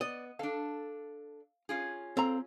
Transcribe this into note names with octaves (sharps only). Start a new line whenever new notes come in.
B3 D5 D#5
D4 A4 F5
C#4 F4 G#4
C4 A4 F5 A#5